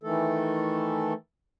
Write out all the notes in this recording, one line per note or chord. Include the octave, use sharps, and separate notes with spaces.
D#3 E3 A3 A4